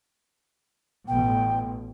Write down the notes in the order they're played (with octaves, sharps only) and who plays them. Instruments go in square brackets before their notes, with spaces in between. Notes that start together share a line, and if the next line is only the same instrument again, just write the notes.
[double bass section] A1 B2 [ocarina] G5